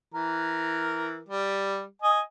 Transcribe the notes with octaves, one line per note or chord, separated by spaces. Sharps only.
E3 A#4
G3
D#5 G#5